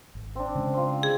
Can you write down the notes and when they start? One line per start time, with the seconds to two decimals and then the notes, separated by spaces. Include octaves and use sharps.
0.15 G#1
0.35 C4 D4
0.55 C#3 G#3
0.73 C4 F4
1.03 G#4